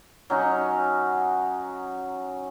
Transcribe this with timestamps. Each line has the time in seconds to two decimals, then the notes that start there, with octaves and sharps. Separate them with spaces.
0.30 F#3 C#4 D#4 F#4